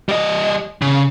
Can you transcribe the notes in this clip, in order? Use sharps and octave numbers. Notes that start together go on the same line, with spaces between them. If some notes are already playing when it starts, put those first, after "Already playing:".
G3 D#5
C#3